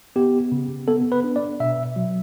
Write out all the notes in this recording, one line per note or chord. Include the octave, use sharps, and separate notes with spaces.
B3 G4
C#3
B3 A4
B4
D4
D5
B2 E5
F#3